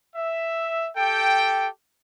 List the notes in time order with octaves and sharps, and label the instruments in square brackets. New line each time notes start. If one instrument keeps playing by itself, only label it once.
[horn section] E5
G4 A4 G5